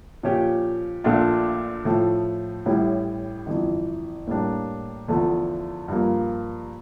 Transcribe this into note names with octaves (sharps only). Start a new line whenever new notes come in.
A#2 F3 C#4 G4
A#1 A#2 A3 D4 F4
A2 F3 A3
A1 A2 G3 C#4 E4
G1 F2 E3
A2 G3 A#3 D4
E2 D3 F3 A3
G2 F3 A#3